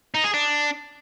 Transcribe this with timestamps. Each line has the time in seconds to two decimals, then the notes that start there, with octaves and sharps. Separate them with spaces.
0.14 D#4
0.24 G#4
0.34 D4